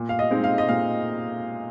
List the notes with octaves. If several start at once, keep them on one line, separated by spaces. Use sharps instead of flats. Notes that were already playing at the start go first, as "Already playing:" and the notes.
Already playing: A#2
F5
D#5
G#3 C4 D#4
F5
D#5
A#2 F5